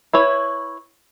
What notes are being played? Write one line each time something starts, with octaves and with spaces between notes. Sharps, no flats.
E4 B4 C#5